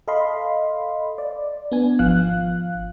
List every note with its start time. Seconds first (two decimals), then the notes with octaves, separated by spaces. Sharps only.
0.08 A4 D#5 F5 B5 C6
1.18 D5
1.72 B3 D4 G#5
1.99 G#1 F3 F5 F#6